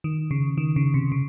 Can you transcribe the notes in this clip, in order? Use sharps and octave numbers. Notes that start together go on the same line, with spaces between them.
D#3
C#3
D#3
C#3
C3
C#3